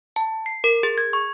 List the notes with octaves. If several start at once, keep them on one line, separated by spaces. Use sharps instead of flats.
A5
C7
A#4
G#4
G#6
C#6